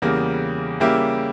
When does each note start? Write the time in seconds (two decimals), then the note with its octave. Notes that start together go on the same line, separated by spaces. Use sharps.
0.02 E2 C#3 G3 A#3
0.80 C#3 G3 A#3 E4 G4